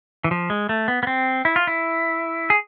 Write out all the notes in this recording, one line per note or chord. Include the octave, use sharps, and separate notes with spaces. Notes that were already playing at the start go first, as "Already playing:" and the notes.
E3
F3
G#3
A3
B3
B3
C4
E4
F4
E4
G#4